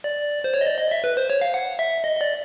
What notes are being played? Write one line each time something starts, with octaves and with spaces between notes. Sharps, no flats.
D5
C5
C#5
D#5
D5
D#5
E5
B4
C5
C#5
F5
F#5
E5
D#5
D#5
D5